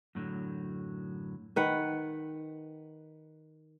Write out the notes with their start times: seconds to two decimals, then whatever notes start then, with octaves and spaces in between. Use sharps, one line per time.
0.15 F#2 A2 D3 F#3
1.56 D#3 B4 F#5